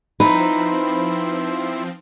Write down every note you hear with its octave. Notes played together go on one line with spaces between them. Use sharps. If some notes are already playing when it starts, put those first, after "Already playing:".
F3 C4 D#4 E4 B4 C5